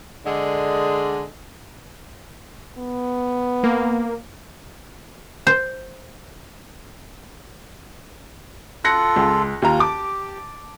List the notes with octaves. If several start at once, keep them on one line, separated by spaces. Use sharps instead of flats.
D3 G#3
B3
A#3
C5
F4 A4 F#6 A#6 C#7
C#2
D#2 F4 A#5
G4 A5 D6